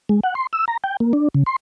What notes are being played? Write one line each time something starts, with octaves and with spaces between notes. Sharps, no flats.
G#3
F#5
C6
E6
A#5
G5
A#3
D4
C#3
C6